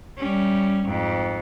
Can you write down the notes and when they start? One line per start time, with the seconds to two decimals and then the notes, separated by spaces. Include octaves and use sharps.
0.18 G3 C#4
0.86 F2 G#2